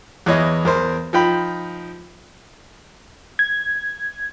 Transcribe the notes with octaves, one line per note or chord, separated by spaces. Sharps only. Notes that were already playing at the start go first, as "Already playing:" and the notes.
E2 E3 C#5 D#5
E2 A#4 C5
F3 D#4 G5 B5
G#6